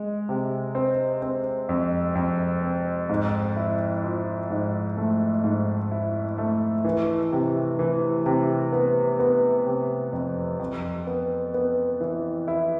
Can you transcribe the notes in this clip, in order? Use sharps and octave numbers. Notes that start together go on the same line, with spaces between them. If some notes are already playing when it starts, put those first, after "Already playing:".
Already playing: G#3
C3
C4
C4
F2
F2
C4
G#2
E4
F3
G#2
A3
G#2
E4
A3
E3
C3
E3
C3
B3
B3
C3
F2
F2
B3
B3
E3
E4